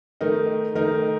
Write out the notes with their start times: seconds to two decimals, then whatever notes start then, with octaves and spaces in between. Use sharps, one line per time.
0.21 D#3 A3 D#4 A#4
0.75 D#3 A3 D#4 A#4